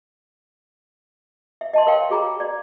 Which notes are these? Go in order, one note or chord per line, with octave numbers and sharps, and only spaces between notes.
E5
D#5 A5 C6
A#4 C#5 F5 G5 C6
F#4 G#4 A#5 B5
D5